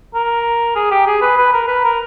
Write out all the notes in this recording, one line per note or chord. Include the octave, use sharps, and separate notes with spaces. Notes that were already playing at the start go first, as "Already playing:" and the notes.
A#4
G#4
G4
G#4
B4
B4
A#4
B4
A#4